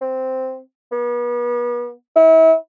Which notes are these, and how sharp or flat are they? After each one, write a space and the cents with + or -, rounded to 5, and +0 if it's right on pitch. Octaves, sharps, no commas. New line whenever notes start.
C4 -5
B3 -40
E4 -35